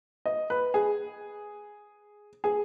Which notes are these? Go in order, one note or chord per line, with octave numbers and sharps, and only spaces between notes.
D#5
B4
G#4
G#4